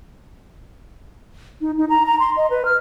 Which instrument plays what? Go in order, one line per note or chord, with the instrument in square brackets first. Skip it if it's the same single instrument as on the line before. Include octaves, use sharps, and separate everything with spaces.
[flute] D#4
D#4
A#5
A#5
C6
D#5
B4
F6